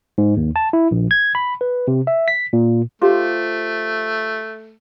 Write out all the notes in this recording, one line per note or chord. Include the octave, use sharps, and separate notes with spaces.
G#2
D#2
A5
E4
A#1
G#6
B5
B4
C3
E5
B6
A#2
A3 F4 G4 C5